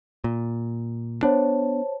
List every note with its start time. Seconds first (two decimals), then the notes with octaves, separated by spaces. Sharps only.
0.24 A#2
1.23 B3 D4 C5 C#5 A5